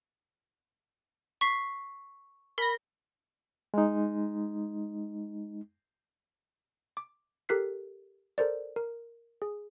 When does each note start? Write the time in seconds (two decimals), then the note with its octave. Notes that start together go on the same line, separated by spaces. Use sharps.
1.41 C#6 B6 C7
2.58 A#4 B5 A#6
3.74 G#3 D#4
6.97 D6
7.49 G4 A4 A#4 F#6 B6 C7
8.38 A4 A#4 C5 D5
8.76 A#4
9.42 G#4